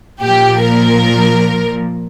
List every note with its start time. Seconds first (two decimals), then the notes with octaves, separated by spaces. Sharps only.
0.21 A#2 F3 G4
0.62 A#4